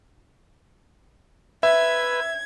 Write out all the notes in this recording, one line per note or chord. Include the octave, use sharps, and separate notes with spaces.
B4 E5 G#6